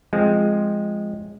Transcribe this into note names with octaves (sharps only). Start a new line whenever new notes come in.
F3 G#3 C4